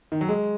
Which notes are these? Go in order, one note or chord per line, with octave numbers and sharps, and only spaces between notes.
D#3
F#3
G#3